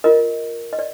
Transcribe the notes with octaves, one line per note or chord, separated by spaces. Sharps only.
F4 A#4 D#5
D#5
D5